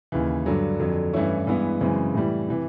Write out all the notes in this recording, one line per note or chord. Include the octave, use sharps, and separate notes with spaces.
D#2 C#3 E3
G2 D3 F#3
F2 D3 F#3
G2 E3 A3 C#4 E4
G2 E3 G#3 B3 E4
F#2 C#3 E3 G#3 C4
A2 E3 G3
C3 E3